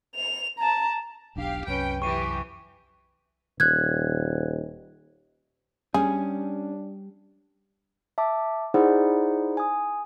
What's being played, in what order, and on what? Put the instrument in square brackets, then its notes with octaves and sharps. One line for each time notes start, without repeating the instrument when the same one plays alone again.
[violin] F7
A5 A#5
[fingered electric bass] E1 B1 D4 [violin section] G4 F5
[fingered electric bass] C2 F#2 [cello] C#4 B4 [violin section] G5
[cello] E3 [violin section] G4 [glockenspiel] C#6 D#7
[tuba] D#1 [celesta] F#6 G#6
[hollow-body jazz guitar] G3 [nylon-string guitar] C#4 [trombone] D4 [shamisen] G#4
[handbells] E5 A5 D6
D#4 E4 G#4 C5 D5 F#5
G#5 D#6